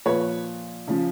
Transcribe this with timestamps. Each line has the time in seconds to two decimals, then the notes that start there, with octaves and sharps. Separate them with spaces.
0.06 A#2 F3 B4 C#5
0.88 C#3 F3